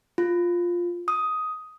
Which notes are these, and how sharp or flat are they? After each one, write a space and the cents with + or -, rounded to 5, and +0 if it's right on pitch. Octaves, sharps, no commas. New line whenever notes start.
F4 +5
D#6 +10